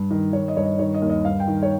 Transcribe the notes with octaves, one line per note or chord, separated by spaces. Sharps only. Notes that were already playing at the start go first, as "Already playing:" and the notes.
Already playing: G2
D#3
D#3 C#5
D#5
G2 C#5
D#5
D#3 C#5
D#5
D#2
D#5
G2 F5
G5
D#3
C#5